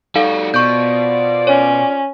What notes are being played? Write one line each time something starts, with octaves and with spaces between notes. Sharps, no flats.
G3 D#4 F#4 A4 F5
B2 F4 C5 D5 C#6 G6
C#4 C#5